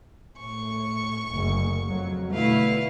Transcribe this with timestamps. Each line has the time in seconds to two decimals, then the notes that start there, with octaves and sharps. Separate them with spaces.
0.38 A2 C#6
1.29 F#1 D2
1.88 F2 F#3
2.33 B2 D3 A3 E4 B4 F5